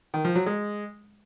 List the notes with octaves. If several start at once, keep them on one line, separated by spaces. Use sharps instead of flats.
D#3
F3
F#3
G#3